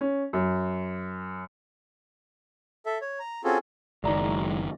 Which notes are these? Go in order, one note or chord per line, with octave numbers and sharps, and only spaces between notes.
C#4
F#2
A4 E5
C#5
A#5
C4 C#4 F4 F#4 G#4 A4
F#1 D#3 F#3 G#3 E4 D5 A#5